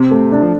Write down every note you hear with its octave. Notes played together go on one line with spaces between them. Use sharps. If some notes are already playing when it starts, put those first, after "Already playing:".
Already playing: C3 C4
A3
D4
F3